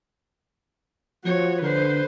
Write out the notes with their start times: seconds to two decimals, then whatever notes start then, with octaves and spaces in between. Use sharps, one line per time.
1.24 F3 F#4 C#5
1.62 D3 B4 C5